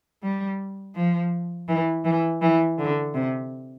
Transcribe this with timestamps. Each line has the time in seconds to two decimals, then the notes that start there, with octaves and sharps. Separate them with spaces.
0.22 G3
0.95 F3
1.68 E3
2.05 E3
2.42 E3
2.78 D3
3.14 C3